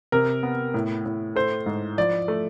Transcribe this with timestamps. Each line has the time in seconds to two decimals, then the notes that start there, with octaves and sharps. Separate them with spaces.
0.12 C3 A#4
0.43 B3
0.74 A2
1.06 A2
1.36 A3 C5
1.66 G#2
1.98 F3 D5
2.28 A3